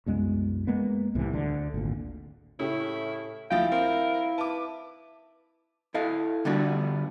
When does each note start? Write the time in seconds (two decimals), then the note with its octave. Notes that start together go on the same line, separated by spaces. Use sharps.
0.06 C2 F#2 G#3 B3
0.67 G#3 A#3 B3
1.15 C2 A2 C3 E3
1.33 D2 D3
1.74 G#1 D2 A#2
2.60 A2 C#3 E4 G4
3.51 D2 F3 E4 F5 G5 A6
3.72 C4 A#4
4.38 B4 A5 D6
5.94 E4 A4 D#5 F5
6.45 D3 G3 B3 D4 F4 F#4